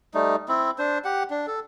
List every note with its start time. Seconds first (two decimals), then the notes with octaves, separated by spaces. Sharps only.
0.14 G3 A3 D#4
0.49 C4 E4
0.78 D4 C5
1.05 G4 F#5
1.30 D4
1.47 A4